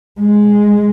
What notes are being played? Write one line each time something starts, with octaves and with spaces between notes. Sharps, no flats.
G#3